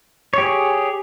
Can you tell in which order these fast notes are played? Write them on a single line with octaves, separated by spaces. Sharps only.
C#5 G4 G#4